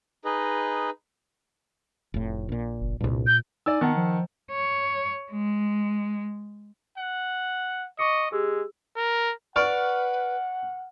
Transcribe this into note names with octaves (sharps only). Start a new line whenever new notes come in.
D#4 G#4 B4 D#5
F1 A2
A#1 A#2
F#1
C2 G2 A#2
G6
D#4 D5 G#5 E6
D#3 B3 F#5 A5
F3
C#5
G#3
F#5
D#5 C#6 D6 C#7
G#3 G4 G#4 E6
A#4
B4 D5 F#5 C#6 F6